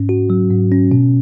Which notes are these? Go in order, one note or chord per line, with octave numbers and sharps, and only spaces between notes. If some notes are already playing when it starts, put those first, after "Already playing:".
Already playing: G#2 C#4
F#4
F#3
G#2
C#4
B2